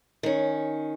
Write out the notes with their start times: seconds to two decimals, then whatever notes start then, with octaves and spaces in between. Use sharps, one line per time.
0.23 D#3 C#4